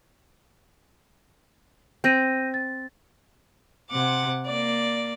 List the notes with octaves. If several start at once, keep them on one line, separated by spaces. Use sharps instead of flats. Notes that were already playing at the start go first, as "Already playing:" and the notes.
C4 G6 A#6 D#7
A6
C3 F#5 D6
A#3 D5